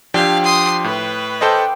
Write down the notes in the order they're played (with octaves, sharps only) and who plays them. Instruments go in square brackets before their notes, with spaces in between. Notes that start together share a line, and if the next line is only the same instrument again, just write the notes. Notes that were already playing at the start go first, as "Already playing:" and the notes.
[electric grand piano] F3 D4 G4 [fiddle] F5 [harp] G5 E6 G#6
[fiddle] C6 D#6
[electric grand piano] A2 [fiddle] B4
[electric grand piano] A4 C5 D#5 [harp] F5 G5 D6